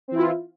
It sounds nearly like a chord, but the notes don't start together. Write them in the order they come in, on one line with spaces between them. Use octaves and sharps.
C4 E3 E4 F4